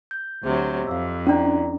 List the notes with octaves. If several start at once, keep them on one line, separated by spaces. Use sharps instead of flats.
G6
D2 C3 F#3
F2 F5 D6 E6
C#4 D4 E4 D5 A#5